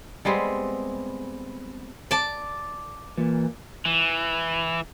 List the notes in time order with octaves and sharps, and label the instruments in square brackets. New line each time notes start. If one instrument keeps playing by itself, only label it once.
[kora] G3 G#3 B3 C4
[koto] D5 A5
[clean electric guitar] A#2 [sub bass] E3
[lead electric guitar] E3